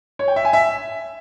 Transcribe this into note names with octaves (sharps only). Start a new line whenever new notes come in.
C#5
G5
E5
G#5
E5